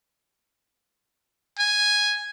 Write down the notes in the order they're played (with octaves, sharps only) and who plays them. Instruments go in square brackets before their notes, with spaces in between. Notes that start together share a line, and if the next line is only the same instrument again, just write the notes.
[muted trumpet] G#5